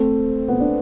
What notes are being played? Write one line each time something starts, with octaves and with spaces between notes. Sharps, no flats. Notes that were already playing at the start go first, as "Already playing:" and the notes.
Already playing: A3 C4
B3
D4